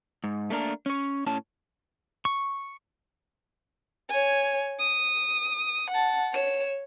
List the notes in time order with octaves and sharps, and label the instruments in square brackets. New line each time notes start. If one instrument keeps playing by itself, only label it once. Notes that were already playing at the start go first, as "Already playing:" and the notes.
[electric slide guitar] G#2
A3 A#3 D4 A#4
C#4 C#5
A2 C#4 A5
[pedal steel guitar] C#6
[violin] C#5 G#5
D#6
F#5 A5
C#5 E7